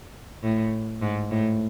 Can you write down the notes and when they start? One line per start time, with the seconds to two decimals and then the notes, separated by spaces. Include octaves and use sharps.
0.43 A2
1.02 G#2
1.31 A2